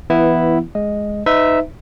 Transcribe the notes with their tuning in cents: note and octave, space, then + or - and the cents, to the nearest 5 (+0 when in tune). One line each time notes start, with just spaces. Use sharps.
E3 +15 B3 +0 E4 +0
G#3 +0 D#5 +0
D#4 +0 B4 +40 E5 -5